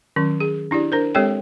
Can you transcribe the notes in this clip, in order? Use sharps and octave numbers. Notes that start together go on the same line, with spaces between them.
D#3 F#3 C#4
G#4
D4 E4 G4 D5
D4 A#4 C5
G#3 C4 G4 A4 C#5 G5